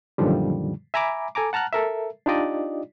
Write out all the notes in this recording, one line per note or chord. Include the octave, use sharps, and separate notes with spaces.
F#2 A#2 D3 D#3 F3 G3
E5 G#5 A#5 B5 D6
A4 G#5 A#5 D6
F#5 A5 A#5 F6 F#6
A4 A#4 E5
D4 D#4 F4 G4 D5 D#5